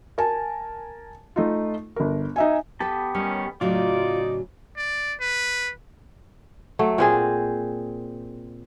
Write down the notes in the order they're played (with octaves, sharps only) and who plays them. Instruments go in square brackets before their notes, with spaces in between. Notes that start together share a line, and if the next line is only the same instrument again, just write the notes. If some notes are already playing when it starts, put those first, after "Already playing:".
[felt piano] A#4 G#5 A5
A3 D#4 F4
G1 A#4
D#4 E5 G#5
[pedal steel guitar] B3 G4 A5 [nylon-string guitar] A4 B4
[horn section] D#3 A#3 C#4 [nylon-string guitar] G3
[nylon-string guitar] A2 C#3 F#3 [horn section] D#4 D5 [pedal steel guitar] F4 [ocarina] F#4
[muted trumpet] D5
B4
[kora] F#3 A3
A#2 C4 G#4